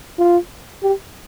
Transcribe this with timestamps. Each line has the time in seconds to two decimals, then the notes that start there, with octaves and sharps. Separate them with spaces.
0.18 F4
0.83 G4